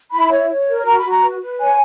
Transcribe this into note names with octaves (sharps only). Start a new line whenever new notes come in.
E4 B5
C#5
C#5
A#4
F#4 A#5
B5
F#4
A#5
B4
B4
C#5 G#5